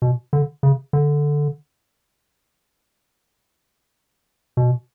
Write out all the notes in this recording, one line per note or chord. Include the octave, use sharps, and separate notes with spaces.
B2
D3
C#3
D3
B2